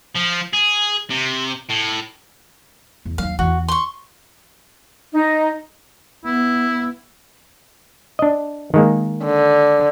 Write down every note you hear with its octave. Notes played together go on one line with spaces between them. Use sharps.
F3
G#4
C3
A2
E2
D#2 F#3 F5
E2 E3 F#4
C6 C#6
D#4
B3 E4
D4 D#5
D#3 G#3 A#3
D3